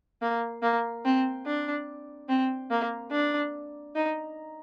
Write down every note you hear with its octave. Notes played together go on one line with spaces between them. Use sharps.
A#3
A#3
C4
D4
C4
A#3
D4
D#4